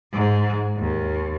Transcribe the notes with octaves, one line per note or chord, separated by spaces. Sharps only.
G#2
D#2